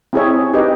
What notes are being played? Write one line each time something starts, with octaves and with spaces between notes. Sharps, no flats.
C4 E4 G#4 C#5 E5
D#4 G4 B4 D#5